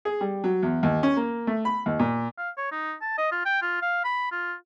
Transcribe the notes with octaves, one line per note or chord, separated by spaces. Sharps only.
G#4
G3
F#3
E2
D#2
C#4
A#3
A3
B5
D#2
A#2
F5
C#5
D#4
A5
D#5
F4
G5
F4
F5
B5
F4